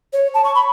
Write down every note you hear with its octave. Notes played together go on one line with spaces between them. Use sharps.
C#5
A5
C#6
B5